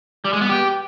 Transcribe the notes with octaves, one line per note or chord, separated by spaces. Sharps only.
G3
G#3
B3
G4